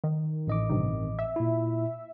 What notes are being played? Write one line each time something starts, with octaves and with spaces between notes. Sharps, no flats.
D#3
A1 D#5 D6
G2 C3 D#3
E5
A#2 E4